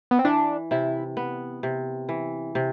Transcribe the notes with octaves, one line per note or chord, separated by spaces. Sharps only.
B3
C4
E3 D4
C3 E4
B3
C3
E3
C3